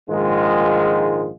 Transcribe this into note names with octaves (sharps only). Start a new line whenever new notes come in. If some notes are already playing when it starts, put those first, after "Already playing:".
A#1 G#2 D#3 G#3 F4 G#4